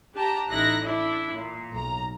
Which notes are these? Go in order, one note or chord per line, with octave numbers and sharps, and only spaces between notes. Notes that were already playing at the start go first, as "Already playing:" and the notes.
D4 G4 A5 A#5
A1 D#4 E4 F#6 A#6
D4 E4
A#2
B1 A#5